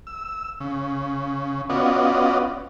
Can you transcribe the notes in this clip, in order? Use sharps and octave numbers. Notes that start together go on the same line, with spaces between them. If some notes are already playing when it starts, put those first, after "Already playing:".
E6
C#3
B3 C#4 F4 F#4 D5 D#5